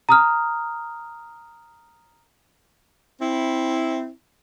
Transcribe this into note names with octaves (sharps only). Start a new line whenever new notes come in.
A#5 D#6 F6
C4 E4